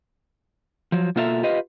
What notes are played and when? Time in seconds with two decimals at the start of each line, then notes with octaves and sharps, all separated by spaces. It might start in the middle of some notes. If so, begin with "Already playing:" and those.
0.92 F3 F#3
1.16 B2 A#3 F4 A4 E5 A#5
1.43 F4 G4 B4 D#5 F5